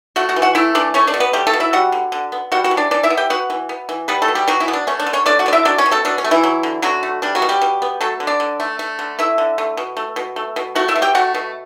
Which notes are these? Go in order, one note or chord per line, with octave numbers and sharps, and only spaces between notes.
A3 F#4 F#5
F#4 F#5
E3
F#4 F#5
A3 E4 E5
E3 D4 D5
A3 C#4 C#5
D4 D5
B2
B3 B4
G3 A3 G4
A3 A4
B2
E4 E5
G3 F#4 F#5
D3
D3
B3
G3 F#4 F#5
F#4 F#5
E3
D4 D5
E3 D4 D5
E4 E5
B3
G4 G5
B3 F#4 F#5
E3
B3
E3
G3 B3 B4
A3 A4
B2
G3 G4
B2 F#3 F#4
E3 E4
B3
D4
A3 C#4
D4
D3
C#4 C#5
A3 D4 D5
F#4 F#5
D3 D5
E4 E5
F#3 D4 D5
C#4 C#5
B2
A3 A4
B2 D4
C#4
A3
E3 E4
F#3
D3
D3 F#3 F#4
A3
G3 D4
F#3 F#4
B2
G3 G4
B2
B3
F#3 A3 A4
D3
D4 D5
D3
A3
A3
D3
A3 E4 E5
D3
A3
B2
A3
B2
A3
B2
A3 F#4 F#5
E4 E5
B2
G4 G5
A3 F#4 F#5
B2